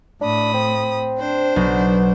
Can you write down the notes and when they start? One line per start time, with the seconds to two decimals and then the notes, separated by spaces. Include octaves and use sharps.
0.21 A2 D4 B5 D#6
0.54 C4
1.18 D4 C5
1.56 B1 B3